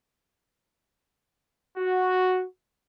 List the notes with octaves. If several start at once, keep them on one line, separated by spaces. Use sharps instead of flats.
F#4